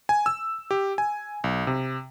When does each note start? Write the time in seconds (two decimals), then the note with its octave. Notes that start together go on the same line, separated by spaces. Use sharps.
0.09 G#5
0.26 E6
0.71 G4
0.98 G#5
1.44 B1
1.67 C3